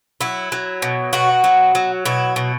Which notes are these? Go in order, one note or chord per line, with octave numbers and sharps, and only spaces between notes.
F#3 E4
F#3
B2
B2 F#4
F#3
F#3
B2 E4
B2